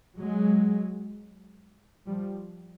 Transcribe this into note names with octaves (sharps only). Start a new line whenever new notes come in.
F#3 G#3
F3 G3